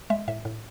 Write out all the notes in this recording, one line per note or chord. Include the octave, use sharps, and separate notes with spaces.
G#3 E5
A2 E5
A2